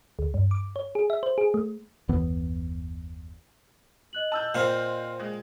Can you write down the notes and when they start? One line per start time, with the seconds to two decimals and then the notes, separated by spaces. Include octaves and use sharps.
0.19 D2
0.34 G2
0.51 D6
0.76 C#5
0.95 G#4
1.10 E5
1.23 C5
1.38 G#4
1.54 A3
2.08 F#1 D#2 E3 B3
4.13 D#5 F#6 F#7
4.32 A5 E6 G6
4.55 A#2 C4 C5 F5
5.20 G#3